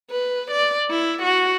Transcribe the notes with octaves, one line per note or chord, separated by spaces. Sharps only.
B4
D5
E4
F#4